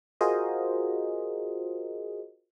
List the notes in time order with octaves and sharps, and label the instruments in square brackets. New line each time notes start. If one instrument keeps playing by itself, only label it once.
[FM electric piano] F4 F#4 G#4 A#4 C5 D#5